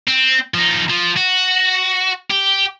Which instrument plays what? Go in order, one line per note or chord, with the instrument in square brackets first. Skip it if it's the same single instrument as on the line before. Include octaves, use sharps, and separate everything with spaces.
[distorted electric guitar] C4
F3 D#4
F3
F#4
G4